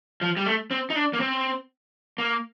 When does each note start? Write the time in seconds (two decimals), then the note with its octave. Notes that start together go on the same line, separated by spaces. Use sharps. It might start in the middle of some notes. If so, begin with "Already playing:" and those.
0.21 F3
0.37 G3
0.46 A3
0.71 C4
0.90 D#4
0.96 D4
1.13 A#3
1.20 C4
2.18 A#3